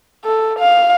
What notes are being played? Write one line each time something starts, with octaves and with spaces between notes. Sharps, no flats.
A4
F5